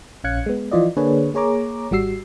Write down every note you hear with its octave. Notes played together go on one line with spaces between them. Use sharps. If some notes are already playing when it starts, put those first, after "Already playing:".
A#1 C#4 F5 F#6 G#6 C#7
G#3 B3
E3 F3 F4 D5 D#5
D3 A#3 D4 G#4 B4 C#5
A#3 G#4 C#5 A#5 D6
G#1 G3 F#4 E6 C7